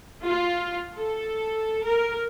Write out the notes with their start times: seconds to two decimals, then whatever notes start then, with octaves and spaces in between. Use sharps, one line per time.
0.24 F4
0.97 A4
1.85 A#4